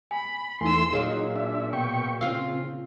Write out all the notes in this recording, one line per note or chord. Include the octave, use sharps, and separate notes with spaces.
G#5 B5
E2 A3 D#4 G#5 C6 E6
A#2 F#3 D#4 F4 G#4
D4 E5
B2 G5 C#6
C#3 C4 F4 F5 E6